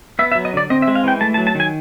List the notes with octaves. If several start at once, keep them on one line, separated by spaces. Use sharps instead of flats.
B3 E5
E5
F#3
D#5
D3 D5
C4 D#5
E5
G#3
F5
E3 G5
A3 A5
A5
F#3
A5
D#3 G#5